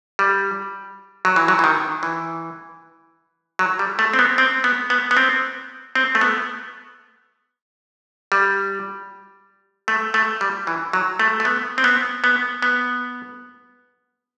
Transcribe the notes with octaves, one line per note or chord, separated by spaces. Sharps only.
G3
F#3
E3
F#3
E3
D#3
E3
F#3
G3
A3
C4
B3
C4
B3
B3
B3
C4
C4
A3
B3
G3
A3
A3
G3
E3
F#3
A3
A3
B3
C4
B3
B3
B3